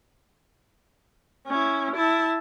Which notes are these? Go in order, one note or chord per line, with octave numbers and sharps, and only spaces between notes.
C#4 E4
E4 A5